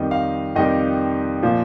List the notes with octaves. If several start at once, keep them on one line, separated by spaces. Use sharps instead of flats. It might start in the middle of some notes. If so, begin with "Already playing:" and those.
Already playing: F2 D#3 G3 D#5
F5
F2 D#3 G3 D#5
A#2 F3